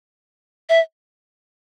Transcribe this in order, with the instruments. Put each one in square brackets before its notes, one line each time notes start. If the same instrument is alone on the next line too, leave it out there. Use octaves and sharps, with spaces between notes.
[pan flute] E5